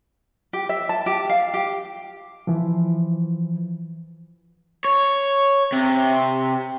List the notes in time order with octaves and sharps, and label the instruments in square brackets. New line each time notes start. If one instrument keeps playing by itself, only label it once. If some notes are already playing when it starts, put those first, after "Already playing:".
[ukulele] G4
E5
A5
G4
F5
G4
[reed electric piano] E3 F3
[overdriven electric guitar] C#5
C3